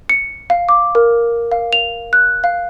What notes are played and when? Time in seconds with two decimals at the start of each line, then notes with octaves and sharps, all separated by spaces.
0.09 C#7
0.50 F5
0.69 D6
0.95 A#4
1.52 F5
1.73 F7
2.13 F#6
2.44 F5